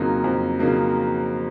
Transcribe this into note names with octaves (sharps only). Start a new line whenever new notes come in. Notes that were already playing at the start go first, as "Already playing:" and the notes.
Already playing: F2 C#3 F#3 A#3 D#4
F2
C#3 F#3 A#3 D#4